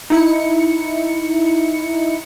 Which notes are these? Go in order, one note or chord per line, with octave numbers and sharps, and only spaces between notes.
D#4 E4 C#7